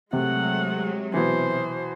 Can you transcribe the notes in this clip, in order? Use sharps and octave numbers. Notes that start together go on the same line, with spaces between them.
C3 F#3 G#3 A3 F#5
B2 E3 C5